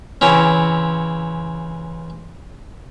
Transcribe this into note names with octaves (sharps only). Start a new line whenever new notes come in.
C#3 E3 C4 C#4